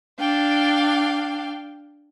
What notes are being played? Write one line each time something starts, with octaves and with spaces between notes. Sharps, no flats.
D4 F5 G5